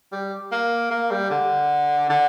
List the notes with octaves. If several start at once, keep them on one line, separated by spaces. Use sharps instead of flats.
G3
A#3
A#3
G3
D3
D3